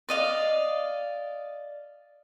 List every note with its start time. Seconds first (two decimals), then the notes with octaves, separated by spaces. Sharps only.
0.09 D5 D#5 F5